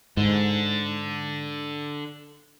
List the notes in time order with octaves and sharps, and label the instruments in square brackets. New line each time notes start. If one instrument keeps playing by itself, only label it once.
[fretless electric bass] G#2 [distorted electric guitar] D3